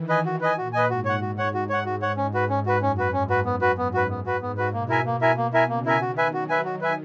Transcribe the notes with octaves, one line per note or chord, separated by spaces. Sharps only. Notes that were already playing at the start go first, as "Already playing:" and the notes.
Already playing: D#3 E3
B4 D#5 G#5
F#4
B4 D#5 G#5
A#2 F#4
B4 D#5 G#5
G#2 F#4
C#5 F#5
F#4
C#5 F#5
G#2 F#4
C#5 F#5
F#4
C#5 F#5
C#4
F#4 B4
C#4
F#4 B4
F#2 C#4
F#4 B4
G#2 C#4
F#4 B4
F#2 B3
F#4 B4
G#2 B3
F#4 B4
B3
F#4 B4
G#2 B3
F#4 B4
B2 A#3
E4 A#4 E5 G#5
A#3
E4 A#4 E5 G#5
A#3
E4 A#4 E5 G#5
C#3 A#3
E4 A#4 E5 G#5
D#3 F#4
B4 E5 G#5
F#3 F#4
B4 E5 G#5
D#3 F#4
B4 E5 G#5